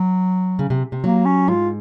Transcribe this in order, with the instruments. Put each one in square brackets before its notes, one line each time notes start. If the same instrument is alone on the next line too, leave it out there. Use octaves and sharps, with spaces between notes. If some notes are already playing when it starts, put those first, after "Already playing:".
Already playing: [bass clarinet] F#3
[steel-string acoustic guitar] C#3
C3
C3
[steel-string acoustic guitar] F#3 [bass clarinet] A#3
[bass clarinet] C#4
[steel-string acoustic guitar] G#2 [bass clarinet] F4